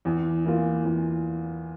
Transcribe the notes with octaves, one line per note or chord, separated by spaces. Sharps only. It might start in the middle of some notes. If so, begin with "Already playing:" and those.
E2
E3 A#3 F4
E2